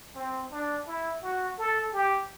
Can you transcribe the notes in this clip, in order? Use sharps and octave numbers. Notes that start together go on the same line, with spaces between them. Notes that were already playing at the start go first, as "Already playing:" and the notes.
C4
D4
E4
F#4
A4
G4